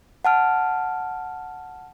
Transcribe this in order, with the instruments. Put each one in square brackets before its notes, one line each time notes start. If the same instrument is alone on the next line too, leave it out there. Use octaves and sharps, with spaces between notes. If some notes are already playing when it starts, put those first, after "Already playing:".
[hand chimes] F#5 A5 F6 D7